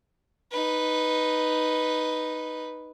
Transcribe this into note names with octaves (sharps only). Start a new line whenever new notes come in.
D#4 B4